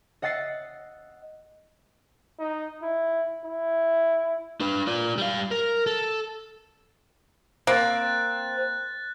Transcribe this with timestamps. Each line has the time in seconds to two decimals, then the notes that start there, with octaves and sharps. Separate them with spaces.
0.22 D#5 F#5 E6 A6 C7 C#7
2.39 D#4
2.83 E4
3.46 E4
4.60 D4 B4
4.87 F4 D5
5.18 G3 F5
5.51 A#4
5.86 A4
7.67 A#3 C4 F#6 A6